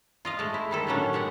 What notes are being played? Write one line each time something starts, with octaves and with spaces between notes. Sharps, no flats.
F4 D#5 F5
G#3 A3
E4
D#3 G3 A4
A2 D#3 F#3 G3 C#4 D4
A#2 G#3 G4 F#5